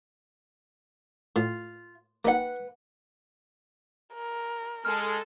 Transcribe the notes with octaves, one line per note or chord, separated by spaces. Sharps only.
A2 F4
A#3 D#4 B4 F#5
A#4
G#3 A4 F6